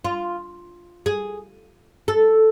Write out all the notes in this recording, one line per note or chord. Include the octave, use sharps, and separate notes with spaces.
F4
G#4
A4